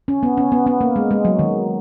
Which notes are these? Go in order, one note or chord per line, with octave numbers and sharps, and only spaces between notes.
C#4
B3
C#4
B3
B3
A#3
G#3
G#3
F#3
D#3